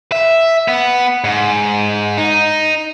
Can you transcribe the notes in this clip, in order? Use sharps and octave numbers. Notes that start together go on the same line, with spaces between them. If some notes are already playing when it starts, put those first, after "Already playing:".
E5
B3
G#2
D#4